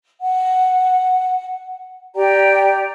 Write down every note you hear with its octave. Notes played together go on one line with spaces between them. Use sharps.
F#5
G4 D5 G5 A#5